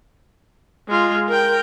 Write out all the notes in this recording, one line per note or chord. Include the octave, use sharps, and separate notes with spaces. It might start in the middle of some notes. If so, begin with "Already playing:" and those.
G#3 F4
A#4 G5